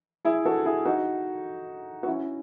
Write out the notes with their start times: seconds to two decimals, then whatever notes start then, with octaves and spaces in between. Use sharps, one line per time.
0.25 E4 G#4
0.46 F#4 A4
0.66 E4 G#4
0.85 D#4 F#4
2.03 F#4
2.07 C#4 E4